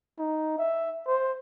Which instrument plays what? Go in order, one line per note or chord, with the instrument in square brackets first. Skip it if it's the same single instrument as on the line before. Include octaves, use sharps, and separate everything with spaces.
[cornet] D#4
E5
C5